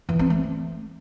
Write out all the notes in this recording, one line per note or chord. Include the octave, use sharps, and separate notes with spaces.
E3
C4
A3